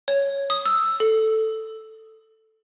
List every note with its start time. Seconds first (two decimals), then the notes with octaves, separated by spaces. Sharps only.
0.08 C#5
0.50 D#6
0.66 E6
1.00 A4